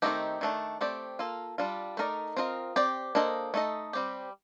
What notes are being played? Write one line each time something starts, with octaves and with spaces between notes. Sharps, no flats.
D#3 A3 C4 D#4 G4
D#3 A3 D4
A3 C4 G4 D5
A#3 F4 A4
G3 D4 F4
A3 D#4 A#4 D5
C4 F4 A#4 D#5
C4 G4 D5
A#3 D4 A4 C5 D#5
A3 D#4 A4 D#5
G3 C4 G4